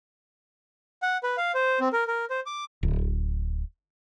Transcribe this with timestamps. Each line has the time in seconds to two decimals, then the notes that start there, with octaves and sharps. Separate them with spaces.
1.02 F#5
1.23 B4
1.37 F5
1.54 C5
1.80 C4
1.93 A#4
2.08 A#4
2.30 C5
2.46 D6
2.83 D1